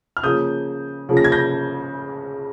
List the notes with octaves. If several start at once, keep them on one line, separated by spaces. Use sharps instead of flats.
F6
C#3 F3 A#3 D#6 G6
C#3 F3 A#3
A#6
G#6
G6 A#6